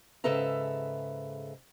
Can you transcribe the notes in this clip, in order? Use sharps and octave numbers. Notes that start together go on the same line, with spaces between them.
G#2 C#3 A4 B4 E5 A#5